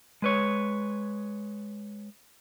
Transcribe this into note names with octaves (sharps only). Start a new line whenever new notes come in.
G#3 B4 C#5